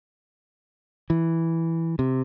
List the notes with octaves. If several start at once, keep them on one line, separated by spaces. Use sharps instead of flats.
E3
C3